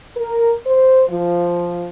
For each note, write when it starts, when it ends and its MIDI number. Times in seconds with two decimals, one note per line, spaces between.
0.17 0.53 70
0.66 1.03 72
1.09 1.88 53